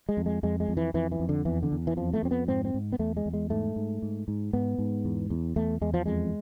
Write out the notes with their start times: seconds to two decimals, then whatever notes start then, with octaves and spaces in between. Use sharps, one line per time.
0.09 G#3
0.17 F2
0.26 G#3
0.43 F2 G#3
0.60 G#3
0.69 F2
0.77 E3
0.94 F2 E3
1.12 E3
1.20 F2
1.29 D3
1.45 E2 E3
1.63 D3
1.72 E2
1.87 E3
1.97 F2 F3
2.14 A3
2.23 F2 C4
2.31 B3
2.48 G#2 C4
2.65 C4
2.74 G#2
2.92 B3
2.99 E2 A3
3.17 G#3
3.26 E2
3.33 G#3
3.50 G#2 A3
3.76 G#2
4.02 G#2
4.28 G#2
4.53 G#2 B3
4.78 G#2
5.05 E2
5.30 E2
5.56 E2 A3
5.81 E2 G#3
5.94 F3
6.06 F2 G#3